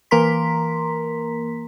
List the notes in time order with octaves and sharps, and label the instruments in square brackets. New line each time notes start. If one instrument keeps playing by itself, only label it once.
[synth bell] E3 A#3 A#4 A#5 C6 B6